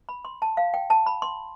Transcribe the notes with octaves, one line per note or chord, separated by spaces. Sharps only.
B5
C6
A5
F5
G5
A5
B5
C6